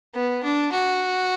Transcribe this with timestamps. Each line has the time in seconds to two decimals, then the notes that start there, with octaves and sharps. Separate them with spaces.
0.15 B3
0.43 D4
0.72 F#4